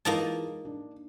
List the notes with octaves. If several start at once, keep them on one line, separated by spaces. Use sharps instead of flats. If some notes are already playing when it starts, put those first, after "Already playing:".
E3 G#3 A#3 D#4 F4 A5
D4